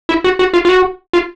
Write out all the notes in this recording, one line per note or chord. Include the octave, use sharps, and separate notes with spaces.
E4
F#4
F#4
F4
F4
F#4
F4